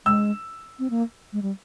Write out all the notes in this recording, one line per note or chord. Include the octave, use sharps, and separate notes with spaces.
G#3 E6
C4
A#3
G#3
G3